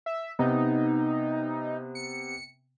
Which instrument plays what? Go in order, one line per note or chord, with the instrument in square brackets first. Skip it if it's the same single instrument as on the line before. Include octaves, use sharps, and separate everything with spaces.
[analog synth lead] E5
[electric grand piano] C3 B3 [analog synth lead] D#4
[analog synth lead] C#7